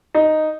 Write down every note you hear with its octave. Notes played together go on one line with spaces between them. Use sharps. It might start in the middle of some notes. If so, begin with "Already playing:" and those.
D#4